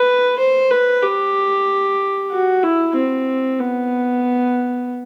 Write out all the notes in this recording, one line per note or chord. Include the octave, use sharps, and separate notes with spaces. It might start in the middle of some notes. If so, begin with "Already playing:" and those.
Already playing: B4
C5
B4
G4
F#4
E4
C4
B3